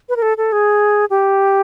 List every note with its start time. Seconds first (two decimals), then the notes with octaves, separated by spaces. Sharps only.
0.09 B4
0.16 A#4
0.22 A4
0.38 A4
0.52 G#4
1.10 G4